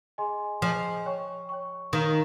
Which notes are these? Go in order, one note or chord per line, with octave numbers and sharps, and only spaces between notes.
G#4 D#5 G#5 C6
F3 G#4 D#5 G#5 C6
C#5 G5 C#6
C#5 G5 C#6
D#3 A#4 F5 A#5